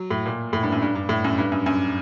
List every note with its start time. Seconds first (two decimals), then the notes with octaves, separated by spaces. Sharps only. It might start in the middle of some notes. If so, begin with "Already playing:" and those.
Already playing: F#3
0.11 A2
0.26 A#2
0.53 A2
0.63 G2
0.72 F#2
0.82 G2
0.95 G2
1.09 A2
1.24 F#2
1.38 G2
1.52 F#2
1.66 F#2